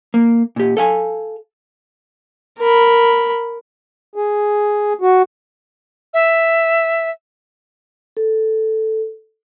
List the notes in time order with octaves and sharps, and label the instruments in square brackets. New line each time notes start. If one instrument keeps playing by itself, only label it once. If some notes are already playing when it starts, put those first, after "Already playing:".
[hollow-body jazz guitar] A#3
A#2 G4
A4 F5 G#5
[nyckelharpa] A#4 B5
[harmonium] G#4
F#4
[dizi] E5
[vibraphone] A4